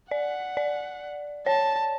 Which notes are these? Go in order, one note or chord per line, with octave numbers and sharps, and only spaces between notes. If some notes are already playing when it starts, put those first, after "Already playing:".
D5 F#5
D5
C#5 A5